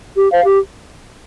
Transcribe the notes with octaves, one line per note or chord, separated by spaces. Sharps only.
G4
C5 F5
G4